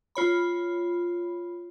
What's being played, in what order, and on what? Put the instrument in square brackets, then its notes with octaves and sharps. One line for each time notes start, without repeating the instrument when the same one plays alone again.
[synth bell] F4 C#5 B5